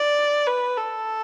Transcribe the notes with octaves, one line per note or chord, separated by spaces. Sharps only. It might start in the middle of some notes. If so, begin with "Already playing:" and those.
Already playing: D5
B4
A4